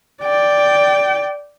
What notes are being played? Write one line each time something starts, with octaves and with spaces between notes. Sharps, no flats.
D5 G5